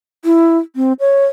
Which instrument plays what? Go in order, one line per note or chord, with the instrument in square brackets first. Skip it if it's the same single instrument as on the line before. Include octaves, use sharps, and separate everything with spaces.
[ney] E4
C4
C#5